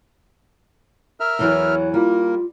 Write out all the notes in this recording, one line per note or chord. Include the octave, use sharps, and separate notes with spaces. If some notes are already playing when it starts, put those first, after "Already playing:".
A#4 E5 F6
E2 E3 F#3 C#5
G3 A#3 F4 A#4